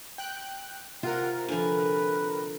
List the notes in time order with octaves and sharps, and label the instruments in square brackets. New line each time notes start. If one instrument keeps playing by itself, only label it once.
[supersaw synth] G5 F#6
[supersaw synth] C3 A#4 [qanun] F4 [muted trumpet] F#5
[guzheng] D3 F3 [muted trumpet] B4 [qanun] G#5